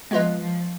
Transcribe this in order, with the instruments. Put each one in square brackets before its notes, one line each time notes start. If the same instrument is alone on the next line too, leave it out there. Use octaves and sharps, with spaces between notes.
[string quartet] F3 [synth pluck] G#3 B3 F4 B4 D#5
[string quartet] F3